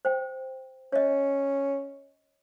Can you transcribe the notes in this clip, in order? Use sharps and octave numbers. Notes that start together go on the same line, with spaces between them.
C5 G5
C#4 C#5 D#5